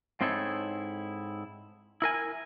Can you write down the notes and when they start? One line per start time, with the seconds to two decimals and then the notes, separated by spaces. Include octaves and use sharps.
0.21 G#2 C4 D#4 E4 A4 C#5
2.02 E4 A#4 G#5